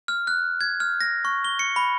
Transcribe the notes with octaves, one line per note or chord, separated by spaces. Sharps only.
F6
F#6
G#6
F6
A#6
C#6
G7
C#7
B5